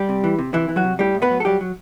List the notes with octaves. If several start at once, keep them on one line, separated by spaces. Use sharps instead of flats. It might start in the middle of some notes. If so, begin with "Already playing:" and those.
Already playing: G3 G4
C3
E3
C3
C3 E3 E4
E3
F#3 F#4
C3
A2 G3 G4
A2
B3 B4
F#3
A4
F#3 G3 G4
F#3